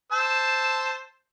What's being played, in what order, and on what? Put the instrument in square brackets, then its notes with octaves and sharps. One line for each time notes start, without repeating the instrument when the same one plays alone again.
[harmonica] C5 A5 E6